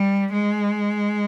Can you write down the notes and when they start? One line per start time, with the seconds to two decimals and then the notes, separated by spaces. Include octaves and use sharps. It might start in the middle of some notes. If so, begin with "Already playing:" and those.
Already playing: G3
0.33 G#3